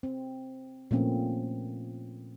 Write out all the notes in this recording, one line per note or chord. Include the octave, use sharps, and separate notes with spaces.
C4
A#2 F3 A3 A#3 C4 C#4